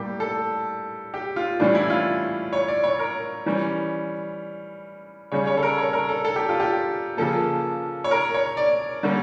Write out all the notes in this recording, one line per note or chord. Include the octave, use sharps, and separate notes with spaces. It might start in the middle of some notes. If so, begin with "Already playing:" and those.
Already playing: A2 G3 A#3 G4
A4
G4
F4
A2 E3 G3 C#4 D4
E4
F4
C#5
D5
C#5
A#4
E3 G3 C#4
C#3 G3 C#4 C#5
C#5
A4
A#4
C#5
A#4
A4
A4
G4
F4
G4
C#3 F3 A#3 A4
C#5
A#4
C#5
D5
D3 G3 A#3 C#4